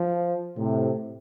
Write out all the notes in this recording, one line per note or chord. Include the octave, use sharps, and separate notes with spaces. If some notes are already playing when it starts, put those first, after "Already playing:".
Already playing: F3
A2 C3